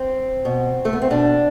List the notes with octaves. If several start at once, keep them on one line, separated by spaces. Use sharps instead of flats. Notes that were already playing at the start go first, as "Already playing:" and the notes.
Already playing: C4
B2
A3
B3
C4
B2 D4